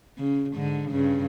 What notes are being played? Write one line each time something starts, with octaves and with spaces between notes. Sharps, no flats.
C#3
G#2 D3
G2 C#3